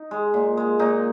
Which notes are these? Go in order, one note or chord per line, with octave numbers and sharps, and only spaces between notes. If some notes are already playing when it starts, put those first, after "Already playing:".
Already playing: D#4
G#3
A#2
G#3
A#2 D#4